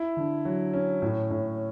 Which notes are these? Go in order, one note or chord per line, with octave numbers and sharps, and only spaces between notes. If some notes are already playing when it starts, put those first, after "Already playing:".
Already playing: E4
D3
F#3
C#4
A2
A2